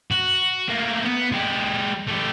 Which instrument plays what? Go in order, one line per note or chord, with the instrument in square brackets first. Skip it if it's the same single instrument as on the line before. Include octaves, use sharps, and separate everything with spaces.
[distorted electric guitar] F#4
A3 A#3
B3
G#3 G4
A3 G4